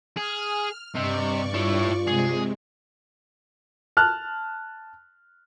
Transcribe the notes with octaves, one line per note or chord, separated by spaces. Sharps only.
G#4 F6
G2 C3 D5 D#5 C#6
E4 F4 C#5
C3 G#3 G#4
A5 F6 F#6